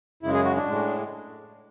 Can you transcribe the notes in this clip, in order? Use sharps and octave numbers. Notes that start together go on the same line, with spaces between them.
F#2 C#3 G#3 E4
G#4
F#4
D4
A2 G#3